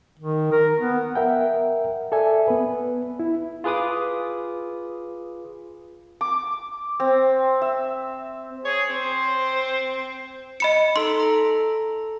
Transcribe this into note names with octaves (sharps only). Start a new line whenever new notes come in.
D#3
A#4
B3
A#4 E5 F#5 G5
A4 D5 E5 G#5
B3 B4
E4
F4 G#4 B4 D6 D#6
D6
C4
E5
G#4 C#5
C4 C5
D#5 B5 C#7
D#4 A4 C6
A4 A#5